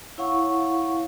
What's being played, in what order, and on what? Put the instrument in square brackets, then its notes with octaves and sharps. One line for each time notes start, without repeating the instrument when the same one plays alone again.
[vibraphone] E4 C#5 F5 F#5 C#6